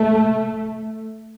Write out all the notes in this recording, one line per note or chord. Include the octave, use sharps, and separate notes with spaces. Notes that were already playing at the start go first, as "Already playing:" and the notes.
Already playing: A3